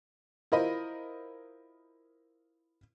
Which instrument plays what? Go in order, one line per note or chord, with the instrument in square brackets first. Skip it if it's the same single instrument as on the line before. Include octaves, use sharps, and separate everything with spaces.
[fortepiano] E4 F4 A#4 C5 D#5 B5